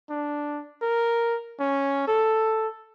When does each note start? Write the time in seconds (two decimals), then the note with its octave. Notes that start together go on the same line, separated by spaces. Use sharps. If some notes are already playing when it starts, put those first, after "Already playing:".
0.10 D4
0.82 A#4
1.60 C#4
2.08 A4